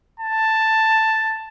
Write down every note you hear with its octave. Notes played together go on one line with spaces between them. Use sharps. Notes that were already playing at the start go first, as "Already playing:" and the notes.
A5